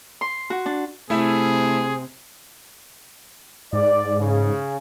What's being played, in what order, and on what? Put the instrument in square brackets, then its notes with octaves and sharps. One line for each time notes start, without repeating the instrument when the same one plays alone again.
[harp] C6
F#4
D4
[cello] C3 [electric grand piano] A3 E4 E5 [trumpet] G#4
[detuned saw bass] G#2 [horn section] D5
[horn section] C#3